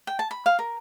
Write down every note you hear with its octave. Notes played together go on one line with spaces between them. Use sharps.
G5
A5
B5
F5
A#4